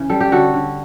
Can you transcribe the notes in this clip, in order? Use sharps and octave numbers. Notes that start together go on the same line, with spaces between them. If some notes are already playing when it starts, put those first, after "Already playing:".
Already playing: C#3 E3
G3 A4
G4
D3 F#4 A4
D3